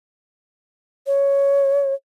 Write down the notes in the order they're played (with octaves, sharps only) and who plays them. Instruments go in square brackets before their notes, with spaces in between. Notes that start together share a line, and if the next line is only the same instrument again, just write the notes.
[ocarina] C#5